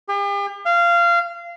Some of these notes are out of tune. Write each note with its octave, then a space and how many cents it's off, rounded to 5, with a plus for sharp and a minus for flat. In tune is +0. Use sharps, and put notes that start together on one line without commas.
G4 +45
F5 -20